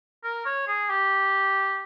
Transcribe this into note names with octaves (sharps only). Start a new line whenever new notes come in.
A#4
C#5
G#4
G4